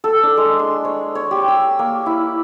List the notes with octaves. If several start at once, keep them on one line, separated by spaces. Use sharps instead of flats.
A4
D4
G#3
C6
C#5
C#5
G4
E6
A#3
E4